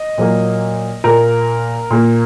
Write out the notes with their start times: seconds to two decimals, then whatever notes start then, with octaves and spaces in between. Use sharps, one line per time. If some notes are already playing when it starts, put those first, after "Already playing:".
Already playing: D#5
0.18 A#2 F#3 A#3
1.04 A#2 A#3 A#4
1.90 A#2 A#3